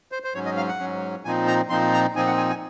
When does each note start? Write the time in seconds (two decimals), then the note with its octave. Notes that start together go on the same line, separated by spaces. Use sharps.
0.12 C5
0.24 C5
0.34 G#2 F#3 C#4 C#5
0.46 D#5
0.57 F5
0.68 F#5
0.79 G#2 F#3 C#4
1.24 A#2 F3 C4 D#4 G#5
1.48 A#5
1.70 A#2 F3 C4 D#4 C6
1.93 A#5
2.15 A#2 F3 C4 D#4 G#5
2.27 F#5
2.38 G#5
2.50 G#5